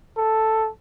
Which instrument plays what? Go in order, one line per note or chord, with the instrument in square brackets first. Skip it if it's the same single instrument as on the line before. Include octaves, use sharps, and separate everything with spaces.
[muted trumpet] A4